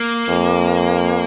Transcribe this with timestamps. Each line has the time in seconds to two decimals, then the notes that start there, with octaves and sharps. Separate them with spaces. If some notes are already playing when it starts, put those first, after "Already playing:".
Already playing: A#3
0.29 F2